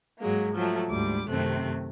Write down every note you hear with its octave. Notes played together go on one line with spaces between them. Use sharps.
G#2 F#3 G#3 A#3
F3 F#3 A3
D2 G#2 G3 D6
F#2 C3 D#3 A3 C4 F#6